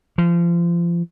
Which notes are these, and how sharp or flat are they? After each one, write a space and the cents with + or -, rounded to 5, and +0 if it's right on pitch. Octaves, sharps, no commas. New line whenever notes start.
F3 -30